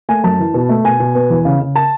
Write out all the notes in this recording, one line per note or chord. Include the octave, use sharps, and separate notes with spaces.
A3 G#5
F#2 A5
E3
B2
A3
B2 G#5
B2
B3
E2
C#3
C#3
A5